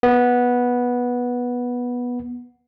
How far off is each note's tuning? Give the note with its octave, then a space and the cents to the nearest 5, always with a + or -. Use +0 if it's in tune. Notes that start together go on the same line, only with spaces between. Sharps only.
B3 -10